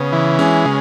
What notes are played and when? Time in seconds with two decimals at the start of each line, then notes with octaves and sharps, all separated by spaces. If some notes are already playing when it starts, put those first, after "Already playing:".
Already playing: C#3 B3
0.12 E3
0.39 G#3 C#4
0.65 C#3